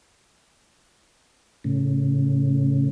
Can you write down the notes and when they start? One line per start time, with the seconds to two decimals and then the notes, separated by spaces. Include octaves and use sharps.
1.64 A2 C#3